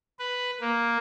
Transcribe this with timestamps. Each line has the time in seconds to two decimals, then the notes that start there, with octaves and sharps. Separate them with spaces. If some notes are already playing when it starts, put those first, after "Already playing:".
0.19 B4
0.61 A#3